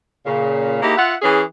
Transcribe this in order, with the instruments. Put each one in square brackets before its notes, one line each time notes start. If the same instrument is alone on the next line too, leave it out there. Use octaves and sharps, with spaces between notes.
[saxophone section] A#2 C#3
A#3 D#4 E4 G4 G#4
F4 E5 F#5
E3 C#4 G#4